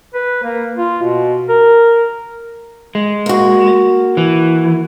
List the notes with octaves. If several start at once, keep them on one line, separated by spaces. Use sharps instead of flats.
B4
A#3
F4
B2
A#4
G#3
A#3 F#4
E3